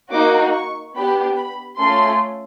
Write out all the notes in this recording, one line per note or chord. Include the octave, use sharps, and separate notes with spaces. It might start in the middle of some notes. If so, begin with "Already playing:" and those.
A#3 D#4 F#4 D6
C#6
B3 D4 G4 B5
B5
A3 C#4 F4 A4 C6